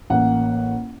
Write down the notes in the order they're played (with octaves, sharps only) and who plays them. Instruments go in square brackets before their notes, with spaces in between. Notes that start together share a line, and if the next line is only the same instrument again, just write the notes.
[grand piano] A1 A#3 F#5